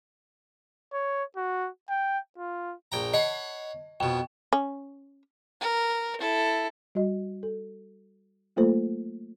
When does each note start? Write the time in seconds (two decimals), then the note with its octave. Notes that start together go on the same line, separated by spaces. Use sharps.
0.93 C#5
1.37 F#4
1.89 G5
2.38 F4
2.92 A#1 G5 A#5
3.14 C#5 D#5 F#5 B5
4.00 F2 B2 G5
4.53 C#4
5.61 A#4
6.20 E4 A4
6.95 G3 F#4 D#5
7.43 A4
8.56 F#3 A3 A#3 F4 A4 C5